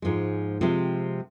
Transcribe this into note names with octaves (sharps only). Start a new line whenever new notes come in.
G#2 F3 G#3
C3 F3 G#3 C4